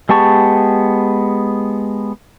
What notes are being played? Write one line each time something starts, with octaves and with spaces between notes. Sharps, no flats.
G#3 B3 G4 A5 C#6